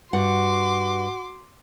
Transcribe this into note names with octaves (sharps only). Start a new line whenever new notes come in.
G2 F#4 F#5 C6 D6